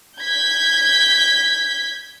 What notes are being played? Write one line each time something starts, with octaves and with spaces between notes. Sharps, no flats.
G6 G#6 B6